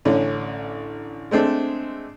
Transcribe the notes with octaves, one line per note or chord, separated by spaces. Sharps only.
A1 D3 C#4
G#3 A3 C4 D4